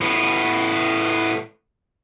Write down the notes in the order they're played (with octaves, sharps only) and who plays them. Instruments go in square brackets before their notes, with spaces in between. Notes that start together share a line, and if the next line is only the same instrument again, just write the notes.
[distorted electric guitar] A2 B3